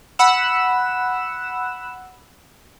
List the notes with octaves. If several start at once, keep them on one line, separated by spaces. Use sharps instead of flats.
F#5 B5 E6 E7